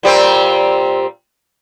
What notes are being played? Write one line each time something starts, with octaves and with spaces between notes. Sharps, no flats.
A#2 G3 C4